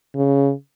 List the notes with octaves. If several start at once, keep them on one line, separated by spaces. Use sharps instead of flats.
C#3